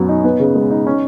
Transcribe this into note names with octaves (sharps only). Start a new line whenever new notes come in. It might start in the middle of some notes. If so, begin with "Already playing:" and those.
Already playing: F#2 F#3 B3
D#4
B3
C#3
G#3
D#4
C#4